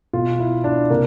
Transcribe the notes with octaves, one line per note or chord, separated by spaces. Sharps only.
B2 F4
E4
D4
C3 A#3